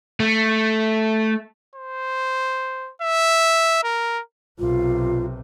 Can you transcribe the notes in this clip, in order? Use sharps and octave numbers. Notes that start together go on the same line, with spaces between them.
A3
C5
E5
A#4
B1 C3 F4